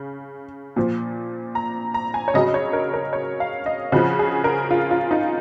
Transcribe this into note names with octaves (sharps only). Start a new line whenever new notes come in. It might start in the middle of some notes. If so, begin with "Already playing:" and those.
Already playing: C#3
A#2 F3
A#5
A#5
G#5
C#5
C#3 F#3 D#5
D#5
C#5
A#4
A#4
C#5
F5
D#5
C#3 F3 F#4
G#4
A#4
F4
F4
D#4